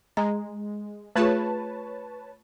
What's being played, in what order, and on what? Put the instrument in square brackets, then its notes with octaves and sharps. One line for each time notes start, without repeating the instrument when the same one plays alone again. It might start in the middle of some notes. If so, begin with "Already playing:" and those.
[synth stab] G#3 [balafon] A#5
[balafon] A3 F4 G#4 [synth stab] B4 C#5 A5